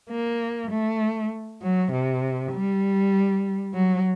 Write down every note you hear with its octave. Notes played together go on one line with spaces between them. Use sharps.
A#3
A3
F#3
C3
G3
F#3